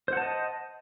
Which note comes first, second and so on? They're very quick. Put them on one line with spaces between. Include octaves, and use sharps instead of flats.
C5 F#5 A5 D#5